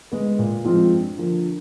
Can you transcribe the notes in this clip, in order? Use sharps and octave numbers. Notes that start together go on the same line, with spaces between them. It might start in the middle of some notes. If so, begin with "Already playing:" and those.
G#3 B3
A#2
F3 G#3 C4 F4
G2
D3 F3 A#3